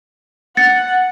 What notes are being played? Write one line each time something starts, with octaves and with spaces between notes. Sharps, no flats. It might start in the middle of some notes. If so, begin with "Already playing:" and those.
F#5 A6 C#7